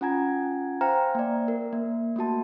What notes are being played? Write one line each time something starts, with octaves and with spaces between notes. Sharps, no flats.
C#4 F4 F#5 G#5 A#5 G#6
C5 F5 G5 G#5 A#5 F6
A#3 D5
A#4
A#3
A3 A#3 F#4 A5